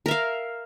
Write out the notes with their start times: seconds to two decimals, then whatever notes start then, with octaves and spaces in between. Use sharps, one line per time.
0.06 A#4
0.08 E5
0.11 F5